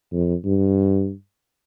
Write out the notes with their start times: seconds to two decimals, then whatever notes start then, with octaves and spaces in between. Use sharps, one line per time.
0.12 F2
0.45 G2